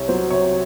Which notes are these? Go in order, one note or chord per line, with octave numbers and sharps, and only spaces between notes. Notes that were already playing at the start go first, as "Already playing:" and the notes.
Already playing: C2 C#5
F#3 C5
C3 C#5